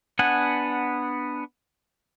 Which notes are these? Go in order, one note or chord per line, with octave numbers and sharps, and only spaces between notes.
B3 D4 F#5 G#5